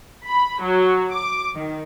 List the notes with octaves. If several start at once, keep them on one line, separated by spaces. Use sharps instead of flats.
B5
F#3
D6
D#3